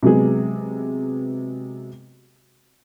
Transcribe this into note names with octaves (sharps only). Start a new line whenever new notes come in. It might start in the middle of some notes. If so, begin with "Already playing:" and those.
C3 F#3 G#3 B3 G#4